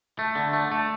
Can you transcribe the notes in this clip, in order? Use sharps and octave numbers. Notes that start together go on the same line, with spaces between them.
A3
D3
A3
A3